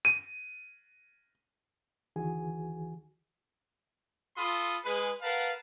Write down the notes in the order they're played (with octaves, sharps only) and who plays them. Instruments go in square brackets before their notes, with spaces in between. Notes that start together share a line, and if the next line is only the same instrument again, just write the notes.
[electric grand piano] D#7
[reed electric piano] D2 D#3 E3 F#4 G#4 G#5
[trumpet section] F4 A4 B5 C6 D#6
G#3 G#4 B4
A#4 B4 F5 F#5 A5